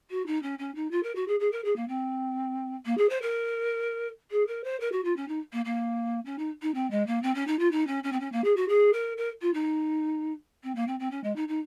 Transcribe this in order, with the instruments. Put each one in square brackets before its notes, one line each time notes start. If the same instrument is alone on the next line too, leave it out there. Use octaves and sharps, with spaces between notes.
[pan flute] F#4
D#4
C#4
C#4
D#4
F4
A#4
F#4
G#4
G#4
A#4
G#4
A#3
C4
A#3
G#4
C5
A#4
G#4
A#4
C5
A#4
F#4
F4
C#4
D#4
A#3
A#3
C#4
D#4
D#4
C4
G#3
A#3
C4
C#4
D#4
F4
D#4
C#4
C#4
C4
C#4
A#3
G#4
F#4
G#4
A#4
A#4
F4
D#4
C4
A#3
C4
C4
C#4
G#3
D#4
D#4